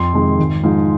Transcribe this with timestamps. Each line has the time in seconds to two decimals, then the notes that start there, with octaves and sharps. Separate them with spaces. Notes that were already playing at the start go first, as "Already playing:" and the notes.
Already playing: F2 C6
0.13 C3 D#3 G#3
0.38 G#1
0.64 G#2 F3 G#3